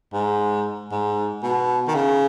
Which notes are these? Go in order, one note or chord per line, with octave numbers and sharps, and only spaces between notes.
G#2
G#2
B2
D#3
C#3